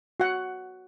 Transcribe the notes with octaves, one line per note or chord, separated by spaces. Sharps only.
F#4 F#5